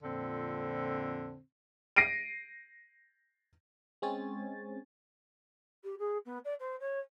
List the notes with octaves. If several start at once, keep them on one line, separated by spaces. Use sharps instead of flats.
F2 A#2 D3 C4
A#6 C7 D7 D#7
G#3 C4 C#4 C#5 G#5 A6
G4
G#4
B3
D5
C5
C#5